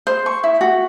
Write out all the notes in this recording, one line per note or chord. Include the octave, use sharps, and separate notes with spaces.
C5
C#6
E4
F#4